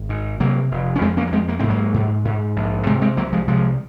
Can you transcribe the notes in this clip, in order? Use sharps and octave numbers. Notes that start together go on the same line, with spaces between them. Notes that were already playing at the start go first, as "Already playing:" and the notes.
Already playing: G#1
G#2
C3 F#3 A#3
F1
C#4
F2 G#3 C4
A#3 C#4
A#3
F2 G#3 C4
A#3
G#2 C4
F#3 A#3
G#2
G#2
A#1
C3 G#3 C4
G#3 C4
C2 F#3 A#3
F3 G#3
C3 F3 G#3